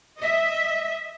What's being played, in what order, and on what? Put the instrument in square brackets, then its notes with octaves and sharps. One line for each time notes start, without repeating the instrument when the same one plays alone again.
[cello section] D#5 E5